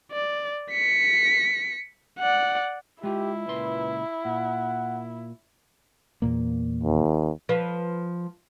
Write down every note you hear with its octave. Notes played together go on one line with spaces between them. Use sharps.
D5
B6 C#7
D5 F#5
G#3 E4 F4 G4
C#2 A#2 B4 C6
A#2 F#5
E2 A#2 A#3
D#2
F3 B4